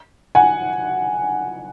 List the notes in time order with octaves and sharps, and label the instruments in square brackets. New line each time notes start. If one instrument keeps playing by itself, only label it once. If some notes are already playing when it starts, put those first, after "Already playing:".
[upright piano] F#5 G#5